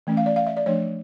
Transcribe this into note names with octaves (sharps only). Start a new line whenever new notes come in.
E3 A3 C#4
F5
D5
F5
E5
D5
F3 A3 D4 C#5